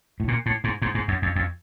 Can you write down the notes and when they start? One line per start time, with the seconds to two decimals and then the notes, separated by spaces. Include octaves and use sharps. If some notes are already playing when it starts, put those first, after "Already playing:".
0.20 A2
0.28 A#2
0.46 A2
0.64 G#2
0.82 G#2
0.95 G#2
1.08 F#2
1.22 F2
1.36 F2